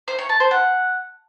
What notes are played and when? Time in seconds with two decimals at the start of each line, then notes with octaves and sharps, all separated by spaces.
0.08 C5
0.19 C#5
0.29 A5
0.40 C5
0.51 F#5